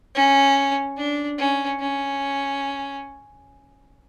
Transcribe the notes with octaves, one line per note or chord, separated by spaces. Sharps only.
C#4
D4
C#4
C#4